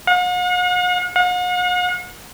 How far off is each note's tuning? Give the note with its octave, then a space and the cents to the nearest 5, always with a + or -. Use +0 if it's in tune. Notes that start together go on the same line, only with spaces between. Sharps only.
F#5 -45
F#5 -45